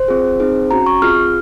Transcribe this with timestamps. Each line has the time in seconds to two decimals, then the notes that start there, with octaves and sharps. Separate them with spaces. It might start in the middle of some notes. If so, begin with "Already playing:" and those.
Already playing: C5
0.08 C4 F4 G#4
0.40 C4 D#4 G#4
0.71 C#4 F#4 A#5
0.86 C#6
1.01 C4 F4 G#4 F6